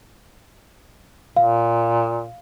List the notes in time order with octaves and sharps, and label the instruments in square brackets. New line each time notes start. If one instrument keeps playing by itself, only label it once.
[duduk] A#2 [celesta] F5